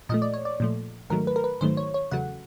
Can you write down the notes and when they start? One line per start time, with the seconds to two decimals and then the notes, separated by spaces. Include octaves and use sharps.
0.09 A#2 F3 A3 D#5
0.22 D5
0.34 C#5
0.45 D5
0.60 A#2 F3 A3
1.10 G#2 D#3 F#3 A3 A#4
1.27 B4
1.36 A#4
1.44 B4
1.61 G#2 D#3 F#3 A3 C5
1.77 C#5
1.94 C#5
2.11 E2 C#3 F#3 A3 F#5